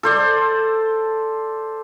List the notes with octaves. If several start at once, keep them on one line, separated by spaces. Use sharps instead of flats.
A4 C5 D5